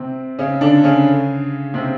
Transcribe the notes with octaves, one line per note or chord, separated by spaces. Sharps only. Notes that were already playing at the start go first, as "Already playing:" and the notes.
Already playing: C3 C4
C#3 C#4
D3 D4
C#3 C#4
C3 C4